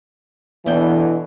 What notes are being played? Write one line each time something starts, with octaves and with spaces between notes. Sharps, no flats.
E2 B2 D3 E3 G5